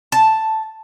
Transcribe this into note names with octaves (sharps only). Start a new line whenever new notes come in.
A5